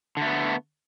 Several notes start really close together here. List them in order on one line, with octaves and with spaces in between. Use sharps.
D3 A3 B3